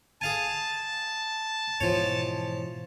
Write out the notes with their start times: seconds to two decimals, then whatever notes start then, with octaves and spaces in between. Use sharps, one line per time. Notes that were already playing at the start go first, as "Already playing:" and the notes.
0.21 G#4 F5 G#5 A5
1.80 G#2 B2 E3 F3 C#5